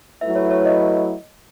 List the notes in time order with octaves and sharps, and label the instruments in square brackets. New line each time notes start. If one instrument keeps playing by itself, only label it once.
[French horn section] F#3 A3 E4 B4 [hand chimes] E5
[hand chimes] C#5
C#5
D#5